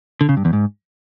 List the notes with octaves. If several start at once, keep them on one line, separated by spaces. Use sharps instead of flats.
D3
C#3
G2
E2
G#2